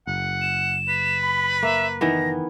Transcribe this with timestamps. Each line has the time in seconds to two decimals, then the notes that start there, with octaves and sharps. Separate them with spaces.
0.07 F#1 F#5
0.42 E7
0.89 B4
1.22 B5
1.63 A#3 E5
2.01 D#3 E3 B3 A#6